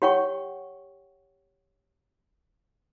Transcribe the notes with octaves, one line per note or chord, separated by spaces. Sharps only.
G4 C#5 F#5 G5 C#6